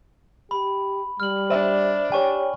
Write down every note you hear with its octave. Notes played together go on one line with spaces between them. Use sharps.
G4 B5
G3 F6 F#7
D4 C5 E5
G4 C#5 G5 G#5 C#6